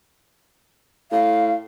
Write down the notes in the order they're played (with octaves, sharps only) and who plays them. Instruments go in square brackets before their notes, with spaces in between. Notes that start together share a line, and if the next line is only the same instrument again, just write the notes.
[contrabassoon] A2 [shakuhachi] F5